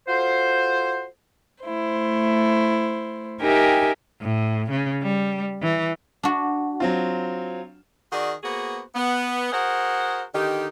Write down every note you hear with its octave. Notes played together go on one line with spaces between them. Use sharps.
F4 F#4 A4 C5
A3 E4 C5
D#4 G4 A#4 E5 G5 G#5
A2
C#3
G3
E3
D4 F#4
F#3 C4 F4
D#3 F#4 G#4 D5
A#3 B3 F#4 G#4 C5
B3
F#4 G#4 A#4 C5 F#5
D3 D#3 D#4 G4